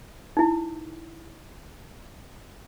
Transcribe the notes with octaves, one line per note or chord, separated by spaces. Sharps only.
D#4 E4